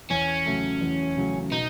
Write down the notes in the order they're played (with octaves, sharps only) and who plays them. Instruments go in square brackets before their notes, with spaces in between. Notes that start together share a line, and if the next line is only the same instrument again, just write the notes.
[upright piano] E2 [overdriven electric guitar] C#4
[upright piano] C#3 F#3 A3
E2
C#3 F#3 A3
[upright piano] B2 [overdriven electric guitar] D#4